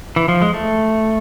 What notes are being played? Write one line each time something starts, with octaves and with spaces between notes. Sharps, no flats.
E3
F3
G#3
A3